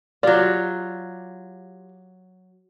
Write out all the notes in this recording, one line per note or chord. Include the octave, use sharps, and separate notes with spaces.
F#3 F4 G4 D5